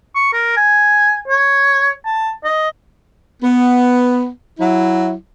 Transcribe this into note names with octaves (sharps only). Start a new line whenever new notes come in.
C#6
A#4
G#5
C#5
A5
D#5
B3
F#3 E4